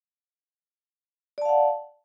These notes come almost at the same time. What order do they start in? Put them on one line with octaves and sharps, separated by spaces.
D5 A5 F5 F#5